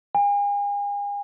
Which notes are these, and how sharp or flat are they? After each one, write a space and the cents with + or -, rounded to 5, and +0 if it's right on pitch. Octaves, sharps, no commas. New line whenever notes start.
G#5 -40